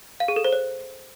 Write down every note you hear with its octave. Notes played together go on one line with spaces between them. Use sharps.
F5
G#4
A4
C5
C#5